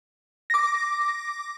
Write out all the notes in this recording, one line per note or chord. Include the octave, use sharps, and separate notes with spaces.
D6 A#6